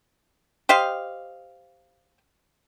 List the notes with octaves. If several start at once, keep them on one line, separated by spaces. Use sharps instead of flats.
G4 C5 D#5 F5